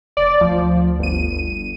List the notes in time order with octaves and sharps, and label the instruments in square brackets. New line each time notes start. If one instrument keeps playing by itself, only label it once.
[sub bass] F1 [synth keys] D5
[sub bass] D2 [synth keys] F3
[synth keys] G1 D#7